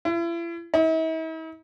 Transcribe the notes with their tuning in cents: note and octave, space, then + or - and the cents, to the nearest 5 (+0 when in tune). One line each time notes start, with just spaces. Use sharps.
E4 +40
E4 -45